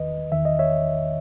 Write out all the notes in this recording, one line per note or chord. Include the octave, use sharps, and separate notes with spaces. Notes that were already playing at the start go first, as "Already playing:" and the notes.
Already playing: E2 D#3 B4 D#5
E2 D#3 E5
D#5
C#5 E5